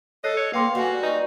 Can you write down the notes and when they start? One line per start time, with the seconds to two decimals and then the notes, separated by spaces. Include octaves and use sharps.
0.24 A4 C#5 D#5 F#6 C7
0.37 C#5 C#7
0.53 A#3 B4 F5 G5 C6
0.75 G3 F#4 F#5 G#5
1.03 D#4 B4